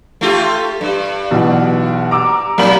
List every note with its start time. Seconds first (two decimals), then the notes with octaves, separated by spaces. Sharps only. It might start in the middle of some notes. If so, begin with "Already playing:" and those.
0.21 A3 F4 G4
0.81 G2
1.31 B1 B2 E3
2.11 A#5 D6 E6
2.58 C2 F#3 A#3 F#7